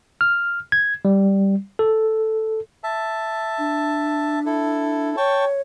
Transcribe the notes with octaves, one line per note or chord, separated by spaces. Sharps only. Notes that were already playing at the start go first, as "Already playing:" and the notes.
F6
G#6
G3
A4
E5 A5
D4
E4 A4
C#5 G5 A5 C#6